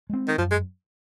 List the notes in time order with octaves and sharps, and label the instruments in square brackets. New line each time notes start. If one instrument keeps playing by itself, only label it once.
[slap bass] G#3 C4
[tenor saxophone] D#3
[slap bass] F#2 [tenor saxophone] F3
[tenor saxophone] G#3